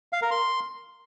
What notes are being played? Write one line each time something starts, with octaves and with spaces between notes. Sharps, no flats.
F5
A#4
C6